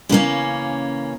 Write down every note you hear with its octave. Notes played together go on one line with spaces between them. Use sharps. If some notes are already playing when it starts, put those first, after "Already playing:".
C#3 E3 A#3 C#4